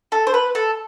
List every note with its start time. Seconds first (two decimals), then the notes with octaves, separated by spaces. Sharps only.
0.12 A4
0.27 C5
0.34 B4
0.55 A4